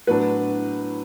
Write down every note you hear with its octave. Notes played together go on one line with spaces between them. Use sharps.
A2 F#3 B3 D4 B4